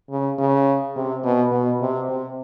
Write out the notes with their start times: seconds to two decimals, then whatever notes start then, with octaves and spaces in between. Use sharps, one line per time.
0.10 C#3
0.39 C#3
0.96 C3
1.24 B2
1.52 B2
1.81 C3
2.09 C3